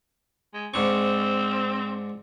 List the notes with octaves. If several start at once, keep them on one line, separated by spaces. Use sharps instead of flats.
G#3
G#2 C4 D4 C#6